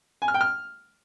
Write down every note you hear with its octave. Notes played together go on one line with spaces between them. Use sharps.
G#5
F6
G5
F6